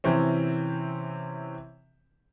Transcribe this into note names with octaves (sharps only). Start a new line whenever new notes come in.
C3 E3 C4 C#4